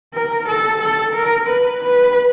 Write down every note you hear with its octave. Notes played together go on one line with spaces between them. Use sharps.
A#4
A4
A4
A#4
B4
B4